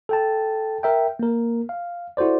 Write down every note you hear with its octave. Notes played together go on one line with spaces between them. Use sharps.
A4 G5 A5
A#4 E5 G5
A#3 A#4
F5
E4 F#4 A4 C5 D5